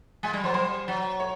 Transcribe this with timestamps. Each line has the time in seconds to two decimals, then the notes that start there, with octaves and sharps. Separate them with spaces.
0.23 G#3 G#5
0.33 G3
0.44 F#3 C5
0.54 G3 C5
0.88 F#3
1.20 C#5